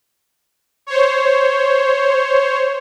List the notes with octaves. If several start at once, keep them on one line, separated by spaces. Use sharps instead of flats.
C5 C#5